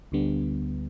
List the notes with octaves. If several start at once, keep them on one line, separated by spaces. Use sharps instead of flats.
D2 D3 G3 B3